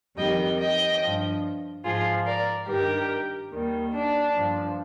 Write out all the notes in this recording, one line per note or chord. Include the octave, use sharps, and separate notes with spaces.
F2 D#3 G3 D#5 G5
D#5 G5
G2 F3
G#2 F3 F4 G#4
A#4 D5
G2 D#3 G3 G4 A#4
D#2 D#3 G3
D4
G2 F3